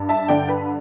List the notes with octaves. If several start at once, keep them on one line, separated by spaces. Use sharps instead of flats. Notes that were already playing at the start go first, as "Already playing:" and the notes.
Already playing: G2
E5 A5
D3 D5 G5
B4